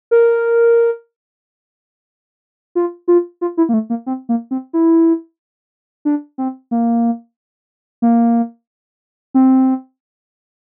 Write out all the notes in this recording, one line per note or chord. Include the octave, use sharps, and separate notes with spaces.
A#4
F4
F4
F4
E4
A#3
A3
A#3
C4
A#3
C4
E4
D4
C4
A#3
A#3
C4